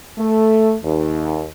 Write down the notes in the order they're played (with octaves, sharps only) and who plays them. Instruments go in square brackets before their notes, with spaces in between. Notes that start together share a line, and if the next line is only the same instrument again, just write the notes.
[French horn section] A3
D#2